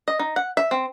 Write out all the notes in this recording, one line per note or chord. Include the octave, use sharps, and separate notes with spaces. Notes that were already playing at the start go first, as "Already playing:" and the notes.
D#5
D#4
F#5
E5
C4